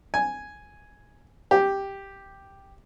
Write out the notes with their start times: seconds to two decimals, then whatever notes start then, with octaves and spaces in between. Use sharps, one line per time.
0.14 G#5
1.51 G4